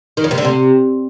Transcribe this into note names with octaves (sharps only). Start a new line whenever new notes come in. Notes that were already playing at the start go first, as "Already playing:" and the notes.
D#3
F2
C3
D3
C3